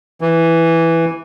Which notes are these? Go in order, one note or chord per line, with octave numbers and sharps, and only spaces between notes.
E3